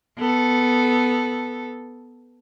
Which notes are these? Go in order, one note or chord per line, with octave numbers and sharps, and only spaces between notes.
B3 A4